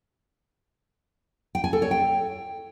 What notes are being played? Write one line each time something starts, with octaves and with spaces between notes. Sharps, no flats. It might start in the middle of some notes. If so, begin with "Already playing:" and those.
G5
G#5
A4
C#5
G5